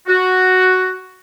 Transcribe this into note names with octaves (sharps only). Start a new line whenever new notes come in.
F#4